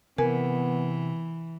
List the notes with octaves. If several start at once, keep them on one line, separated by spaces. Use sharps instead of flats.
C3 E3 B3 A#4 G#5